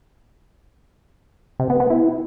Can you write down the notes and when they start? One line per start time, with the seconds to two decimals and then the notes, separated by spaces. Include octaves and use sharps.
1.60 C3
1.70 B3
1.80 B3
1.90 E4